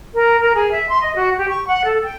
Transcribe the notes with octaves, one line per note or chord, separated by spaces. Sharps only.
A#4
A#4
G#4
E5
C6
D#5
F#4
G4
C#6
F#5
A4
G5